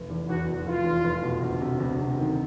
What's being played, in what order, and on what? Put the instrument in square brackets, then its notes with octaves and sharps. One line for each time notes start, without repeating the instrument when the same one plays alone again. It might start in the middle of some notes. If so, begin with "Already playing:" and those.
Already playing: [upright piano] F1
E2
[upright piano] E2 [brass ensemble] F#4
[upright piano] F1
[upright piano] F1 [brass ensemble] F4
[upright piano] E2
F1
B2
D2
C3
D2
C3
D#3